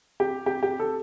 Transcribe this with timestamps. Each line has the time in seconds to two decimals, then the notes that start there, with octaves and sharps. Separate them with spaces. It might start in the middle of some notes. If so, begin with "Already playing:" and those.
0.20 G4
0.46 G4
0.63 G4
0.80 A4